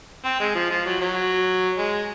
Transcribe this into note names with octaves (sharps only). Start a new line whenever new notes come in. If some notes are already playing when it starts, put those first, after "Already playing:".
C4
G#3
F3
F3
F#3
F#3
G#3